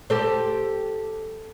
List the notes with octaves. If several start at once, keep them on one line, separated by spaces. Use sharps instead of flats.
G4 A4 C5